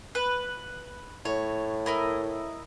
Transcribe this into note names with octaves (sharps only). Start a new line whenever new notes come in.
B4
A2 C#5
E4 A#4 D#5